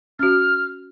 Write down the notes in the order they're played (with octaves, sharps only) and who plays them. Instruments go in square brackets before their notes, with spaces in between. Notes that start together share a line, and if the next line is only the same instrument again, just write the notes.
[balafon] C#4 F#4 [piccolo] F6